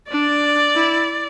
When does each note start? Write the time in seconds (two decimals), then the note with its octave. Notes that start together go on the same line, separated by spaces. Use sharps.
0.11 D4 D5
0.76 E4